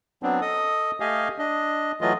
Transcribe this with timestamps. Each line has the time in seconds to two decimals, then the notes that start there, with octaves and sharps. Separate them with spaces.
0.23 F#3 B3 C4 D4
0.41 A4 D#5 D#6
1.00 A3 G4 D#5 F5 G#5
1.39 D4 D#5
2.01 E3 F#3 A3 F4 D#5